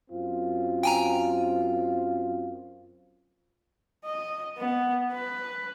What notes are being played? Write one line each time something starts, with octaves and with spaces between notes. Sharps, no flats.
F#2 C4 F4
G5 G#5 A#5
D#5
B3
B4